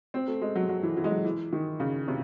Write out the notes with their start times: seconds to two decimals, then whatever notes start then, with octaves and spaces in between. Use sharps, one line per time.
0.14 C4
0.28 A3
0.41 G#3
0.55 F#3
0.69 F#3
0.83 E3
0.97 E3
1.04 G#3
1.11 F#3
1.25 E3
1.53 D#3
1.80 C#3
2.08 C3